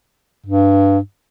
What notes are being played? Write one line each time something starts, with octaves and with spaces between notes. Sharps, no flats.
G2